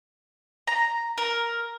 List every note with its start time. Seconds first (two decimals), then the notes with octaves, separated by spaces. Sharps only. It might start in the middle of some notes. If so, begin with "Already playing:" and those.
0.67 A#5
1.18 A#4